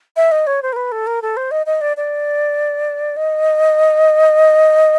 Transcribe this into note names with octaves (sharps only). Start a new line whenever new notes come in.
E5
D#5
C#5
C5
A#4
B4
A4
A#4
A4
C5
D#5
D#5
D5
D5
D#5